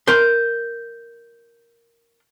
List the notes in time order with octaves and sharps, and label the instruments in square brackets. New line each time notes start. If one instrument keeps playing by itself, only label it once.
[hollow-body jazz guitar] A#4 C6 [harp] G6